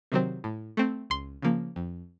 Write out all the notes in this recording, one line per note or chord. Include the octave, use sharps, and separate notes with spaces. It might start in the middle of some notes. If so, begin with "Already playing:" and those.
C3 D#3 F#3 C4
A2
A3 C4
C#2 C6
C#3 F3 A#3
F2